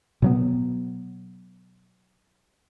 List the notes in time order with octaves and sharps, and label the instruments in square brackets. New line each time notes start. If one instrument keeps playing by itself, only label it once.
[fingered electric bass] B2 F#3 B3